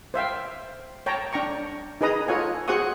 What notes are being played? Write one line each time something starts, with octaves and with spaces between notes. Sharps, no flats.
C5 E5 F5 G5
C#5 G5 A5 A#5
D4 G5 A#5 C#6
D#4 G#4 B4 D#5 A#5 D#6
F4 A4 C#5 F#5 G#5
F#4 G#4 C5 F#5 C#6 D#6